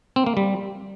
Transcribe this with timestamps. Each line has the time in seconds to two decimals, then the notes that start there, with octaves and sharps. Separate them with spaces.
0.16 C4
0.26 A#3
0.37 G3